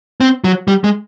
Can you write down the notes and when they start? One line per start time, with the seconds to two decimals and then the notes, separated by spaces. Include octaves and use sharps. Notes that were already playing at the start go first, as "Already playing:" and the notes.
0.20 C4
0.44 F#3
0.68 G3
0.84 G#3